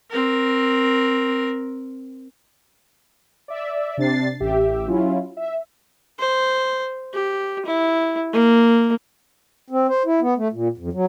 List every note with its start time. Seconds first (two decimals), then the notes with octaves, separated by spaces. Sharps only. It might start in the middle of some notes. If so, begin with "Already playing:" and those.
0.11 C4 A#4
3.48 D5 E5
3.97 C3 D4 A6 C7
4.40 A1 G4 E5
4.88 F#3 C#4 E4 F4
5.37 E5
6.19 C5
7.14 G4
7.66 E4
8.33 A#3
9.70 C4
9.89 C5
10.06 E4
10.21 B3
10.38 A3
10.53 A#2
10.78 F2
10.93 F#3